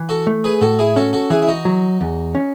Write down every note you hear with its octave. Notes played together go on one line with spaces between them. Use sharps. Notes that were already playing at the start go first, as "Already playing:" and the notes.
Already playing: E3
F#4 A4
A3
G#4 B4
A2 F#4 A4
E4 G#4
C#4 F#4 A4
F#4 A4
E3 E4 G#4
E4
D#4 F#4
F#3
E2
C#4